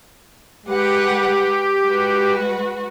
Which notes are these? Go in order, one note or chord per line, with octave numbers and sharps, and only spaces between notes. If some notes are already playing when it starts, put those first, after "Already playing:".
G#3 G4 B4 F#5
G#3 F#4 B4